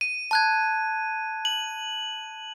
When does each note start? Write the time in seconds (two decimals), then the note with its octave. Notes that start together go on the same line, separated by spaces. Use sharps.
0.01 D#7
0.31 A5 F#6 G#6
1.45 F#7